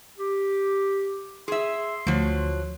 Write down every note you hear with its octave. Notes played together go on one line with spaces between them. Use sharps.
G4
G#4 E5 C6
D2 F3 F#3